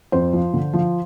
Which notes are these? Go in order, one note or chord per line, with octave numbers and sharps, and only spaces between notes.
F2 C5
F3
D3
F3